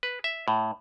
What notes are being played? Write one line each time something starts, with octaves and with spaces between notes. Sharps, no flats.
B4
E5
A2